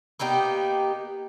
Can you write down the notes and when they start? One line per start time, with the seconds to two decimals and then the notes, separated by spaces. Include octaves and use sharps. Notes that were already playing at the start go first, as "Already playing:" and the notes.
0.19 A#3 B3 D#4 G4